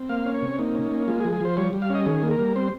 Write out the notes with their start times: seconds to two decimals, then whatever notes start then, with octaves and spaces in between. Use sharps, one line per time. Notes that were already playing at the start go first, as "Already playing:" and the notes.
Already playing: C4
0.09 A#3 F5
0.26 C#4
0.34 C#5
0.42 C3
0.59 A#3 D#4
0.75 C#4
0.91 A#3
1.08 G#3 F4
1.20 G#4
1.25 F3
1.33 G#4
1.41 F3 C5
1.57 G3 C#5
1.73 G3
1.82 F5
1.90 C#4 D#5
2.06 D#3 G#4
2.23 A#3
2.31 A#4
2.39 G3
2.56 C4 C5